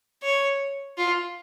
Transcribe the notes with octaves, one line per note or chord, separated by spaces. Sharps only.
C#5
F4